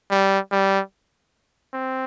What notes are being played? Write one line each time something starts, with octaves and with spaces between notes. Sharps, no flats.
G3
G3
C4